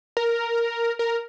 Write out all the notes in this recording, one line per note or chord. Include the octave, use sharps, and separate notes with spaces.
A#4
A#4